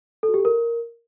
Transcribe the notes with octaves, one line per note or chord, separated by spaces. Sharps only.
A4
F#4
G4
A4
A#4